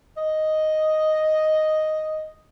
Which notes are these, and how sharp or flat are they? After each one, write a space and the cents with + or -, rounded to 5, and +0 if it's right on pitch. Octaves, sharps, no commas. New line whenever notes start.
D#5 +0